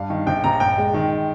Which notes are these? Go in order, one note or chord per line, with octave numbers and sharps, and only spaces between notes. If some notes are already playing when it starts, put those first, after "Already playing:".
Already playing: G2 F5
D#3
A#1 G5
A#1 A#5
G1 G5
G#3
D#3